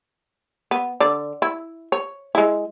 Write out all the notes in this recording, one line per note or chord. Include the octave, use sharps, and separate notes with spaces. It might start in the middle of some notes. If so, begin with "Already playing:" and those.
B3
D3 D5
E4
C#5
G#3 E4